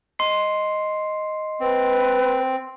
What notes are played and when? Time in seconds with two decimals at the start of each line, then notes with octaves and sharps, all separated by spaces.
0.19 D#5 C6 C7
1.61 C4 B4